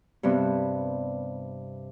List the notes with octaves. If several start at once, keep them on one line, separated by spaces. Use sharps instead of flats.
G2 C3 B3 C4